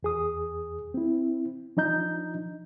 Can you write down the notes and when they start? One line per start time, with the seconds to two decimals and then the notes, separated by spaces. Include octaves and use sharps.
0.03 E2 G#4 D#6
0.94 C4 E4
1.77 F3 D4 D#4 D#5 A#5 G6